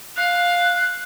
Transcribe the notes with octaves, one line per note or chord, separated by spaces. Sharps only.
F5 F#6